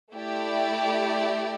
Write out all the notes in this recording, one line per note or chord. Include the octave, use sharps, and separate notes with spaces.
A3 E4 G4 D5